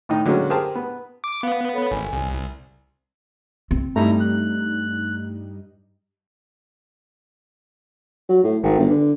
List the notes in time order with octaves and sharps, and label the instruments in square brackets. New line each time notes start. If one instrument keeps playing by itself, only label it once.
[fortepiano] A2 D#3 D#4
D3 F#3 G#3 A#3 C#4
G4 G#4 A#4 C5 A5
B3
[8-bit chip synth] D6
[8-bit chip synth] B3 [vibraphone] F5
[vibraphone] A4 C#5 B5
[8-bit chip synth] G#1 [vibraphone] G#5
[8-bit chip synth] C2
[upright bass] C4
[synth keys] G2 G3 D#4 [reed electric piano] A3 [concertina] E4 A#5
[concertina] F#6
[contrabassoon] F#3
A2
G#1
G1
D3